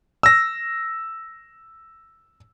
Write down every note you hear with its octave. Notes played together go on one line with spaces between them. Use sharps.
E6 A#6